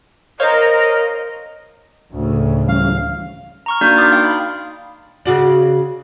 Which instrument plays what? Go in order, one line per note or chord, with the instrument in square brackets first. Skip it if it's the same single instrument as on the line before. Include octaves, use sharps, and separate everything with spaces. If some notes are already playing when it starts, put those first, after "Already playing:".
[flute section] A#4 [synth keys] C5 C#5 F5 [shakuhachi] D#5
[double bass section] D2 [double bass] A2 C#3
[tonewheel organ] E3 G3 C#4 [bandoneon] F5
[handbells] A#5 C#6 F6
A#3 D4 D#4 F#4 D5 G6
D#4 C6 D6 D#6 F6 A6
D#4 F5 G5
B5
[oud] C#3 F#4 D5